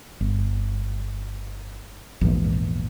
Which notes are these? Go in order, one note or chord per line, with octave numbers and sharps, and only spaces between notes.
G1
A#1 E2 G#2 E3